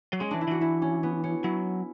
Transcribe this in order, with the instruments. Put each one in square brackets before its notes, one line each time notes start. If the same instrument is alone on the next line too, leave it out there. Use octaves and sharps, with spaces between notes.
[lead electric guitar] F#3
[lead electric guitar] G#3 [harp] C#4
[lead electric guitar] E3 [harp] D4
[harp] E4
[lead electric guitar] E3 [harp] F#4
[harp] E4
C#4
B3
C#4
[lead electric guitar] F#3 [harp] E4